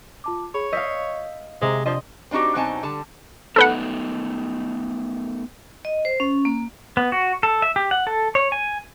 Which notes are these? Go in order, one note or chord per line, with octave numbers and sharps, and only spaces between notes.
F4 A5 D6
G#4 C#5 B5
D#5 F5 E6 G6 B6
C3 G#3 C5 E5 A#5
F3 D4 D5 D#5 C6
C4 D4 D#4 F#4 G4
B2 F#3 C4 D#4 G#5 A5
D3 G3 A5
A3 B3 D#4 A4 B4 F#5
D#5
C5
C#4
A#3
B3
F#4
A4
E5
G4
F#5
A4
C#5
G#5